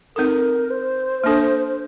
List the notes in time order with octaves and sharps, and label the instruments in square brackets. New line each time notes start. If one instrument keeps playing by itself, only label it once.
[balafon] C4 D#4 A4 [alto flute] A#4
[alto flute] C5
[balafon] A#3 D4 A4